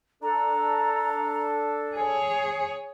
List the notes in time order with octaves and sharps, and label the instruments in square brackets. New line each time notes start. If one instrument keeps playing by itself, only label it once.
[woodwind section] D4 A4 [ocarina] A#5
[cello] G#4 C#5 [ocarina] G#5